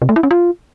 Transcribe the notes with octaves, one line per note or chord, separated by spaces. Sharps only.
C3
A3
E4
C#4
F4